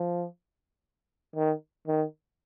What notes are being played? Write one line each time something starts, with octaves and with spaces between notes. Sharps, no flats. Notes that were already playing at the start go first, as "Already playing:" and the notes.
Already playing: F3
D#3
D#3